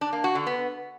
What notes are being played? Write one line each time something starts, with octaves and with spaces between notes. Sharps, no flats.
D4
A#3
F#4
D3
B3